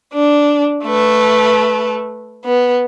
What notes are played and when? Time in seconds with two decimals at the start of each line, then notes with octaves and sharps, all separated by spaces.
0.14 D4
0.85 A3 B4
2.45 B3